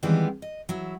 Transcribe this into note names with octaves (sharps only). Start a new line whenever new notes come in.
D#3 E3 G3 G#3 B3 C4
D#5
F#3 E4